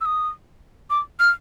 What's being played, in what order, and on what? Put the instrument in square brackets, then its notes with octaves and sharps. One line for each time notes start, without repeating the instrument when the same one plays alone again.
[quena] E6
D#6
D6
F6